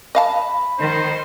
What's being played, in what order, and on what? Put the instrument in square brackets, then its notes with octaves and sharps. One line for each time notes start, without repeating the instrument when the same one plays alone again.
[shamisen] D#5 F5 A5 [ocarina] B5
[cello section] D#3 [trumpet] C5